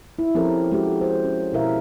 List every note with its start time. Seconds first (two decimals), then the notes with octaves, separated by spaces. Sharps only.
0.19 E4
0.35 F3 C4 C#4 G4 A4 A#4
0.72 G#3 C#4 F#4 G4
1.01 C5
1.24 C#4
1.53 B2 E4 A#4 E5 F5